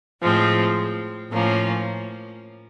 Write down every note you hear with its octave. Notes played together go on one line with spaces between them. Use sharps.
A2 F3 G#3 C4
A2 F3 A#3 C#4